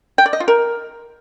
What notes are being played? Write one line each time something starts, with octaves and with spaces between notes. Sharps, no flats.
G5
D5
D#5
F4
A#4